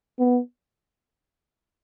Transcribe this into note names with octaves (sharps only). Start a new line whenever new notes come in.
B3